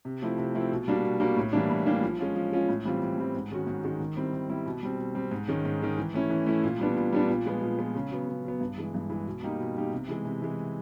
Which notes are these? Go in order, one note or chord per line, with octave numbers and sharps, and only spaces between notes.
C3
F3 A3 C4 E4
C3
F3 A3 C4 E4
B2
G3 A#3 D4 F#4
B2
G3 A#3 D4 F#4
A2
E3 G3 A#3 D4
A2
E3 G3 A#3 D4
F3
G#3 C#4 F4
F3
G#3 C#4 F4
A2
E3 G3 C4 F4
A2
E3 G3 C4 F4
G#2
D#3 G#3 C#4 F#4
G#2
D#3 G#3 C#4 F#4
D#3
G3 C4 E4
D#3
G3 C4 E4
B2
G3 C4
B2
G3 C4
G#2
D#3 G#3 C#4
G#2
D#3 G#3 C#4
E3
A3 C#4 E4
E3
A3 C#4 E4
A#2
G3 B3 D4
A#2
G3 B3 D4
A#2
F3 G#3 B3
A#2
F3 G#3 B3
C#3
F#3 B3
C#3
F#3 B3
G2
E3 G#3
G2
E3 G#3
B2
G3 A#3 D#4 G4
B2
G3 A#3 D#4 G4
C3
E3 G#3
C3
E3 G#3